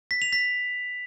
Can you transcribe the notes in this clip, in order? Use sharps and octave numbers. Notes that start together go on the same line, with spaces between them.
B6
F7
B6